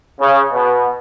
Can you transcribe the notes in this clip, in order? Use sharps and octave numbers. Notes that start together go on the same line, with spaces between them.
C#3
B2